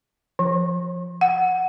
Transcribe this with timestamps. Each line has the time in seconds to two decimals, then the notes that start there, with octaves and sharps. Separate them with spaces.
0.39 F3
1.21 F#5